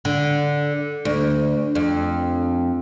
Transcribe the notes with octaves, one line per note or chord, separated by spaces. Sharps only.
D3
D2
F2